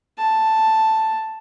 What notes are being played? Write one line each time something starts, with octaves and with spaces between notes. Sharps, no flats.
A5